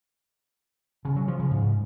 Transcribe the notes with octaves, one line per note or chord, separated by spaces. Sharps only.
C#3
F#3
F3
C#3
G#2